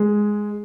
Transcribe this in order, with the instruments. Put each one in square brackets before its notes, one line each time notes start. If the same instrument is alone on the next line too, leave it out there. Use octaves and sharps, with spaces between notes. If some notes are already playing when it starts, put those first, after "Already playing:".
Already playing: [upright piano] G#3